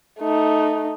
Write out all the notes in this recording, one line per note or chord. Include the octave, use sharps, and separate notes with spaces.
A3 D#4